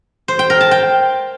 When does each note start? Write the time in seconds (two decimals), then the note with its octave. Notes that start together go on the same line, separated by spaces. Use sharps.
0.28 C5
0.39 G5
0.50 A#4
0.61 A5
0.71 G5